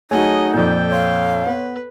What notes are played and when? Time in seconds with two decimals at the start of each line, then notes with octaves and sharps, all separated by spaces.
0.11 F#3 A3 D#4 G#4 C#5 D#5 F#5 G#5
0.54 F2 A#2 A4 D5 G5 G6
0.91 C#5 F5 C6
1.46 B3 B4